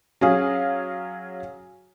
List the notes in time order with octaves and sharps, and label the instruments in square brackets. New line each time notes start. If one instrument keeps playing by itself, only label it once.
[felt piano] F#3 C#4 G#4 F5